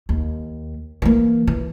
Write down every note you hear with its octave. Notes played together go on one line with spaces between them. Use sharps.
D#2
E3 A#3
E3